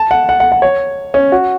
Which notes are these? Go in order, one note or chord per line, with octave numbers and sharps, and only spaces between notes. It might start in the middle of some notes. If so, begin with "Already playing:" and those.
Already playing: A5
F#5
F#5
F#5
F#5
C#5
C#4
F#4